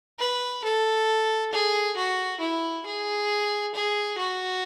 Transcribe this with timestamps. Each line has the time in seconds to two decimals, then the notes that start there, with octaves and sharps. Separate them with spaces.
0.19 B4
0.64 A4
1.53 G#4
1.97 F#4
2.40 E4
2.86 G#4
3.74 G#4
4.18 F#4